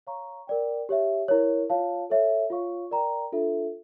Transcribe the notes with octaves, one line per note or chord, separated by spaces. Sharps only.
C#5 F5 A#5 C#6
A#4 D5 G5
G4 C#5 E5
E4 A#4 C#5
F4 C#5 F5 A5
A4 C#5 E5
F4 C#5 F5 C#6
A#4 D5 G5 A#5
D4 F4 A4 E5